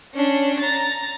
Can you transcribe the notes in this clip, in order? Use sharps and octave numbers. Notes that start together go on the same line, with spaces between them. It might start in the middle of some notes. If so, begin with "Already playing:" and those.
C#4 D4
A#5 A6